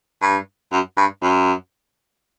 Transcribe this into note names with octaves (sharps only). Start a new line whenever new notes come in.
G2
F#2
G2
F#2